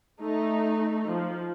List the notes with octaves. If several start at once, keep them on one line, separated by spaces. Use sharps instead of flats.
A3 D#4
F3